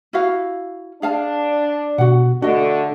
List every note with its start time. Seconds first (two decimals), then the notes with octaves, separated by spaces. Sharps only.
0.13 E4 F#4 F5
1.02 D4 G#4 F5 A5
1.98 B2 F#4 F#5
2.42 D3 A3 D4 F#4 D#5